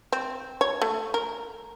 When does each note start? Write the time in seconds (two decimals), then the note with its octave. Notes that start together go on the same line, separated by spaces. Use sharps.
0.12 C4
0.61 C#5
0.82 A3
1.14 A#4